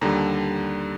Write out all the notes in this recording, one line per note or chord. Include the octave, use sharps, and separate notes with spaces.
D#2 D3 G3 A#5